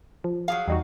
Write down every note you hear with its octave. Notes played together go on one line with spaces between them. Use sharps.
F3
F#3 G#4 F5
E2 G3 D#4 F#4